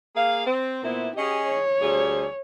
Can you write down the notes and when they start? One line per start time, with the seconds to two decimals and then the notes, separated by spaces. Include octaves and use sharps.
0.15 A#3 G#4 F5
0.45 C4
0.83 A#2 B3 C4 E4
1.16 C#4 G4 G#4 D#5
1.46 C#5
1.81 D2 G3 G#4